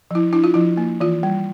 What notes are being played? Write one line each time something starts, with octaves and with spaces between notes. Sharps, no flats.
F3 E4
D4 E4
F4
F3 E4
A#3
E3 F4
G3